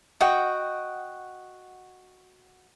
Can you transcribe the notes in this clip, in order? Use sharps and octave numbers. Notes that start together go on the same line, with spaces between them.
F#4 D#5 F#5 G5